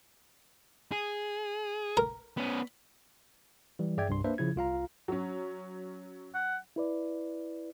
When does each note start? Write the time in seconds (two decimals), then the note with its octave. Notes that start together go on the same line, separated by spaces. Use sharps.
0.92 G#4
1.97 A#4
2.37 B3 C#4
3.79 E3 G3
3.97 G2 G#4 D5 E5 G5 G#6
4.09 C2 G2 C6
4.24 A#3 D4 B4 C5 E5
4.38 C#3 F3 E4 G#6
4.56 C2 F4 F5 A#5
5.08 F#3 C#4
6.34 F#5
6.76 E4 B4 D5